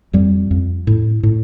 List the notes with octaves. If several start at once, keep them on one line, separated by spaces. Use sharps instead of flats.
F2 G3
F2
A2
A2